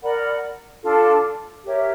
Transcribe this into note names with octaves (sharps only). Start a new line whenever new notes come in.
A#4 D5 F#5 B5
D4 F4 A4
G4 A#4 C#5 E5